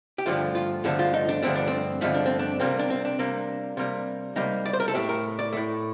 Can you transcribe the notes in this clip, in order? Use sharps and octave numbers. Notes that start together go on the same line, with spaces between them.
G4
G2 D3 F3 A3 F4
F4
G2 D3 F3 A3 A4
F4
D#4
D4
G2 D3 F3 A3 C4
D4
C4
G2 D3 F3 A3 D#4
D4
C4
D4
C3 G3 A#3 C4
D4
C4
D4
C3 G3 A#3
C3 G3 A#3
C3 G3 A#3 D#4
D5
C5
A#4
A4
A2 A3 G4
A#4
D5
A2 A3